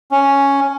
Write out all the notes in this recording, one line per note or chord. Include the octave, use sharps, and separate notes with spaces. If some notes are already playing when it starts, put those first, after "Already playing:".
C#4